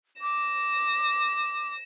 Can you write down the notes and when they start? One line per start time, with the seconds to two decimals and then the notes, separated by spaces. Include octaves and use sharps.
0.22 D6 A#6 E7